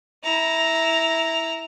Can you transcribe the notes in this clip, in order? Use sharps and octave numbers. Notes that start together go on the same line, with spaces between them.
E4 A#5